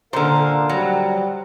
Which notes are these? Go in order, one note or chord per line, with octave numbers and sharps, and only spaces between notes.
A#2 D3 A#4 C5 F5
F#3 G3